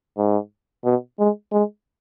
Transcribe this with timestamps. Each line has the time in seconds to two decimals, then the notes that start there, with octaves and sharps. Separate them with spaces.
0.17 G#2
0.85 B2
1.19 G#3
1.52 G#3